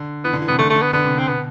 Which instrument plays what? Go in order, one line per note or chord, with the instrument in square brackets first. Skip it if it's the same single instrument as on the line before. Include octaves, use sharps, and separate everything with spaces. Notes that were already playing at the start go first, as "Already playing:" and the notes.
Already playing: [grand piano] D3
[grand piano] E3 [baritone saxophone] B3
[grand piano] D3
E3
[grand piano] C3 [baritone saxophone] B3
[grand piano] D3 [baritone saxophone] A3
[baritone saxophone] A3
[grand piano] D3
[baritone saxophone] B3
[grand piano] D3 [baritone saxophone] B3
[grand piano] C3
[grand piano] C3 [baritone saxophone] C4
[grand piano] B2 [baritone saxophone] B3